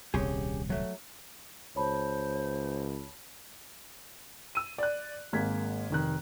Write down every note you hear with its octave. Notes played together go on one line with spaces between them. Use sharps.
D#1 C2 C#4 G4 G#4
F#3 A3
C#2 C5 C#5 A5 B5
E6 D#7
D5 F#6
G#1 G#3 A#3 G#6 B6
F1 D#3 F#6